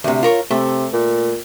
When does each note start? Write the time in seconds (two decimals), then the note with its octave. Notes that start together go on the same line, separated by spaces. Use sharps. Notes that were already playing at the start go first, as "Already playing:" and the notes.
0.04 D2 C3
0.23 F4 A#4 C#5
0.51 C3 A3
0.93 A#2